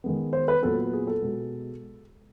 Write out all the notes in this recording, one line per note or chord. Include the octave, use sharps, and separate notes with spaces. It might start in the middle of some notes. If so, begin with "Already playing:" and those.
D#3 G#3 B3
C5
B4
A#2 F#3 B3 A4
G#4
A4
B2 G#3 B3